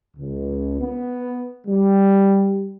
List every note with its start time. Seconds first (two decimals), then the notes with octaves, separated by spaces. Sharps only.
0.17 C#2
0.81 B3
1.67 G3